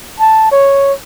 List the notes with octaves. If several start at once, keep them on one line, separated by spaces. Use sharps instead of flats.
A5
C#5